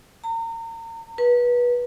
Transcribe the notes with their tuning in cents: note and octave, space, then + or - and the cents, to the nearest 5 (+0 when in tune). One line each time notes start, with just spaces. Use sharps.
A#5 -35
B4 -25